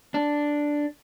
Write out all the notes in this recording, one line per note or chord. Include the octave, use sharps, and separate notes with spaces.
D4